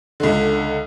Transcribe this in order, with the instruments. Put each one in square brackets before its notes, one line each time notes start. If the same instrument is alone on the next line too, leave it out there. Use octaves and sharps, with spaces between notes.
[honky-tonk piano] C#2 D3